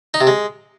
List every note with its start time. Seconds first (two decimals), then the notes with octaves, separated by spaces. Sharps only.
0.14 D#4
0.21 C3
0.27 G#3